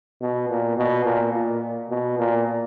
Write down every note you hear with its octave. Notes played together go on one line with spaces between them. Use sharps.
B2
A#2
B2
A#2
A#2
B2
A#2